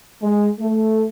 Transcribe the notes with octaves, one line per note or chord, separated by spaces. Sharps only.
G#3
A3